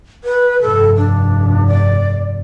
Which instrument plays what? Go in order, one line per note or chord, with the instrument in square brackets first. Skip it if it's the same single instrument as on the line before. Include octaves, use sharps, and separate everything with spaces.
[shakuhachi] B4
[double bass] F1 G2 [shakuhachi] A4
[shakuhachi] D4
D5